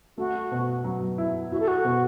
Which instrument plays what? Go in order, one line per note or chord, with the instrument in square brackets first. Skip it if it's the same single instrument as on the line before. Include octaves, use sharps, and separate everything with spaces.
[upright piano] A3 [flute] F#4
[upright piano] B2
F#3
E4
[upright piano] E4 [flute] F#4
[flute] A4
F#4
[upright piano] B2